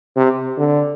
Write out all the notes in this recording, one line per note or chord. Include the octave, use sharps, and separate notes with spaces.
C3
D3